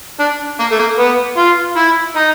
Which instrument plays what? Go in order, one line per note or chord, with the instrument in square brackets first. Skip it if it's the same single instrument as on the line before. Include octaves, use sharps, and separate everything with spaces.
[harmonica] D4
A#3
A3
A#3
B3
F4
E4
D#4